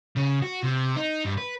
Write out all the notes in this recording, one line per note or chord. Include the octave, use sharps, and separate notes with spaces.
C#3
F#4
C3
D#4
G2
B4